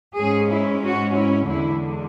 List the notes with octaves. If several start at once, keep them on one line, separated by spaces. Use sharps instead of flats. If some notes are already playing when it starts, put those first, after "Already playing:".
G#2 G#3 C#4 G#4
E4
F#4
E4
E2 D3 G#3 E4